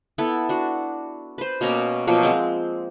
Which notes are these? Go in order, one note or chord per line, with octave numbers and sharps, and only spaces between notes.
B3 E4 A4
D4 F#4
B4 C5
B2 A#3 C#4 A#5
B2 F3 F#3 A#3
G#3 C4